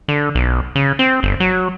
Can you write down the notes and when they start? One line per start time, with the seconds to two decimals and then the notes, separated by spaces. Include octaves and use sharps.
0.08 D3
0.35 B1
0.75 C#3
0.99 C4
1.23 G1
1.40 F#3